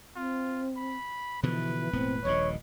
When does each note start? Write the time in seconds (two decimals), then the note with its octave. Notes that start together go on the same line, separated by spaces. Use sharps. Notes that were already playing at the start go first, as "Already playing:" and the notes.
0.16 C4 F4
0.77 B5
1.43 B2 D3 E3 F3 B4
1.93 E1 A2 B3 C4
2.25 D#1 A#1 A#2 C#5 D#5